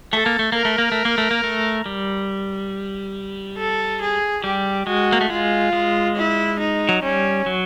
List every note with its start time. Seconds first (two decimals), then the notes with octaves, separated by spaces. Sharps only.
0.13 A3 A4
0.26 A#3
0.39 A3
0.52 A#3 A#4
0.65 A3
0.78 A#3
0.92 A3
1.05 A#3
1.18 A3
1.31 A#3
1.44 A3
1.86 G3
3.58 A4
4.01 G#4
4.44 G3 G4
4.87 G#3 F#4
5.13 A#3
5.21 A3
5.30 G#3 F4
5.73 G#3
6.16 E4
6.59 D#4
6.89 F#3
7.02 G3 C#4
7.46 F#3